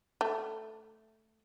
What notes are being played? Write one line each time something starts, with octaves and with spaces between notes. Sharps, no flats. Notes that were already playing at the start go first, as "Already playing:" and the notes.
A3